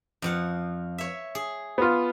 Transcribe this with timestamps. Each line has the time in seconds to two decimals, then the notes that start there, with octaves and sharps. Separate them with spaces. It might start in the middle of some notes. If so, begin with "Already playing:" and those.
0.22 F2 F3 F#5
0.98 C#5 E5
1.35 G#4
1.78 B3 F4